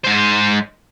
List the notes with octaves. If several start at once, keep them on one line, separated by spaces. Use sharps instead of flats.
G#2 C5